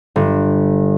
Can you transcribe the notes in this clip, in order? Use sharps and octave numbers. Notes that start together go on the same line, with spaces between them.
G1